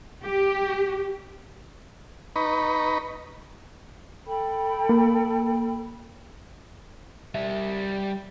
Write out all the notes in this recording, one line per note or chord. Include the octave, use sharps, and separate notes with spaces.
G4
D#4 B4 A#5 B5 C#6
A4 G5 B5
A#3
G3 E5